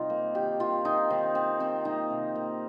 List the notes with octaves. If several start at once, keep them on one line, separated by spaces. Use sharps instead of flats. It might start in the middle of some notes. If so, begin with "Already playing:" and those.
Already playing: C3 G3 D#4 F4
A#3
D#3 G4
D#3 F4
D#3 D#4
D#3 C4
D#3 C4
D#3 C4
A#3 D#4
C3
A#3